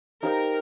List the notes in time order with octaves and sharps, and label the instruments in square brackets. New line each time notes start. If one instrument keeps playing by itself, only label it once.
[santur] D#4 G4 C5 F5 [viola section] A#4